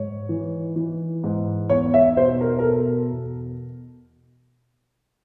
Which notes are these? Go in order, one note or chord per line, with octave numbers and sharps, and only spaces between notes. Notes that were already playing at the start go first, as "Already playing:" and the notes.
Already playing: G#2 C#5
E3
E3
G#2
E2 C#5
E5
B2 C5
A#4
A#4
B2 A4
E2